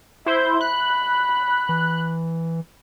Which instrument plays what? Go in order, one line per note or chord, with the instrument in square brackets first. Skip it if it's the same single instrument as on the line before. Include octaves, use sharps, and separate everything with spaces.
[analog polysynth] E4 C5 G6 [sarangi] E5
[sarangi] B5 [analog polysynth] F#6
[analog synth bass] E3